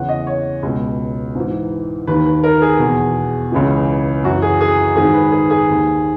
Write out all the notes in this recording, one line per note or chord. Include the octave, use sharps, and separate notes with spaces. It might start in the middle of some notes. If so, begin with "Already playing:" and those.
Already playing: E2 C#3 E3 F#5
D#5
C#5
C#2 B2
G#2 E3
D#2 D#3 B4
B4
A#4
G#4
E2 B2
C#2 C#3 E3
F#2 E3 F#4
G#4
G#4
G#2 D#3 G#4
B4
G#4
G#4
D#2 D#3